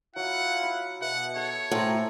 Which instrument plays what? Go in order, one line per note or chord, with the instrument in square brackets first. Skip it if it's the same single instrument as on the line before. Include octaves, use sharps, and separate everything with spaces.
[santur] F#3 [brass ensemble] E4 F4 F5 [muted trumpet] F#5
[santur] B5
[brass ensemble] B2 [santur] B4 E5 [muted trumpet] F#5
[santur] A4 [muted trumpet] C#5
[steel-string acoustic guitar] A2 [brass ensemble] F4 G#5 A#5 [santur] A4 C5